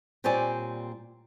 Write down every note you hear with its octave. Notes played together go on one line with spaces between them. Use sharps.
A#2 G3 C4 C#5 D5 G#5